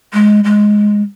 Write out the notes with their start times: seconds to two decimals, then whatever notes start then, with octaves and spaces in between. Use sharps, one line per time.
0.13 G#3
0.44 G#3